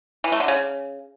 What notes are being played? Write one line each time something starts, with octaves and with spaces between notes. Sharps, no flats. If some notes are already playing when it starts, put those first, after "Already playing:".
E3
A3
D3
C#3